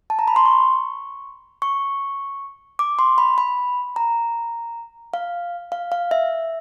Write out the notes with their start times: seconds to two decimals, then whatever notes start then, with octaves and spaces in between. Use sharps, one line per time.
0.10 A5
0.19 A#5
0.28 B5
0.36 C6
0.46 C#6
1.62 C#6
2.79 D6
2.99 C6
3.18 B5
3.38 B5
3.96 A#5
5.14 F5
5.72 F5
5.92 F5
6.11 E5